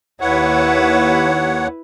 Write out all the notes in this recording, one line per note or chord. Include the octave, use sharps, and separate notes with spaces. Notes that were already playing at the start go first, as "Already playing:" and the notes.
D#2 E4 B4 C#5 F#5